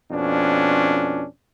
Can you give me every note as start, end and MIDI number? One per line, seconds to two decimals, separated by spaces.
0.11 1.25 41
0.11 1.25 47
0.11 1.25 61
0.11 1.25 62